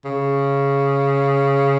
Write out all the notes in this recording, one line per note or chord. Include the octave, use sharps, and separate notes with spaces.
C#3